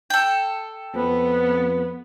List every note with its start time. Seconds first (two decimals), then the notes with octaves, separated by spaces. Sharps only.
0.10 A4 G5
0.95 F2 B3 B4